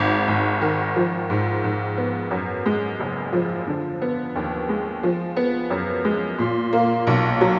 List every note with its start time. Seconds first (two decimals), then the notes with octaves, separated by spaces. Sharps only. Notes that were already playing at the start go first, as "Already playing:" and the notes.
Already playing: G#1 G#2
0.28 G#1
0.61 D#3
0.96 F3
1.30 G#2
1.64 G#2
1.97 B3
2.31 F#2
2.66 G#3
3.00 F#1
3.33 F3
3.67 D3
4.02 B3
4.36 D#2
4.69 G#3
5.03 F3
5.36 B3
5.70 F#2
6.05 G#3
6.38 A#2
6.73 A#3
7.07 B1
7.41 F#3